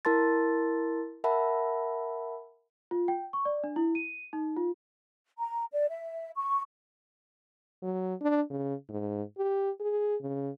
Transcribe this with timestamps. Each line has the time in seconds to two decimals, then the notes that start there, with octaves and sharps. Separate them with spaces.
0.05 E4 A#4 A5 C6 A6
1.24 A#4 E5 F#5 A5 B5
2.91 F4
3.08 G5
3.33 C#6
3.45 D5
3.64 D4
3.76 E4
3.95 D#7
4.33 D#4
4.57 F4
5.39 A#5
5.73 D5
5.89 E5
6.36 C#6
7.82 F#3
8.21 D4
8.50 C#3
8.89 G#2
9.38 G4
9.80 G#4
10.22 C#3